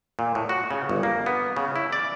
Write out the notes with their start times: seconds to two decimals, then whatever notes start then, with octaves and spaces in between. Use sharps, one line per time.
0.19 A#2
0.35 A2
0.49 F#4
0.71 C#3
0.89 G1
1.03 A#3
1.26 B3
1.56 C#3
1.76 E4
1.93 D5